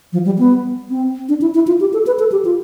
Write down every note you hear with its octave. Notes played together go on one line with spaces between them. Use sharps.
F3
G3
B3
C4
D4
E4
E4
F4
G4
A4
B4
A4
G4
F4